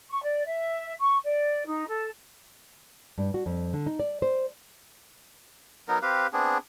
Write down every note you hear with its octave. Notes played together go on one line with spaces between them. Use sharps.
C#6
D5
E5
C#6
D5
D#4
A4
G2
F#4
F2
D3
D#4
D5
C5
F#3 B3 D#4 A#4
C4 G4 B4 F5
B3 C4 D4 G#4